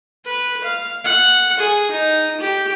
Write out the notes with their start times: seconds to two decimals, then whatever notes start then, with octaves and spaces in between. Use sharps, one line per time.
0.25 B4
0.64 F5
1.04 F#5
1.60 G#4
1.91 D#4
2.40 G4